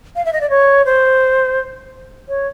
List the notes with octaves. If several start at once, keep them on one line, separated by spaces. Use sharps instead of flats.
F5
E5
D#5
D5
C#5
C5
C#5